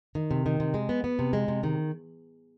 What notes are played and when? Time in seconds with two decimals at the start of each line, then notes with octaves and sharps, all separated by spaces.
0.15 D#3
0.31 C3
0.46 D#3
0.60 C3
0.74 G#3
0.89 B3
1.04 B3
1.19 C3
1.33 G#3
1.48 C3
1.63 D#3